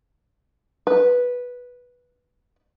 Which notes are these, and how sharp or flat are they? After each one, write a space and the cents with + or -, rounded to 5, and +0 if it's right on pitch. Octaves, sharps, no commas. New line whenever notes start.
B4 -10